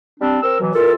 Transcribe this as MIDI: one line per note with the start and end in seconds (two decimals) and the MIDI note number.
0.20 0.38 55
0.20 0.38 60
0.20 0.38 62
0.42 0.58 60
0.42 0.58 70
0.42 0.58 88
0.60 0.73 47
0.60 0.73 52
0.60 0.73 54
0.74 0.95 40
0.74 0.95 65
0.74 0.95 69
0.74 0.91 70